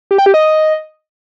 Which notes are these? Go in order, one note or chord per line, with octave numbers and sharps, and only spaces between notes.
G4
G5
G4
D#5